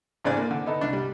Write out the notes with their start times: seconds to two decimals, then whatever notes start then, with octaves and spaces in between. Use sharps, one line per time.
0.24 A1 C#3 C4 D4 D5 G#5
0.37 A#3
0.51 D3
0.66 B3 D#4 A4
0.81 C2 D4
0.93 G3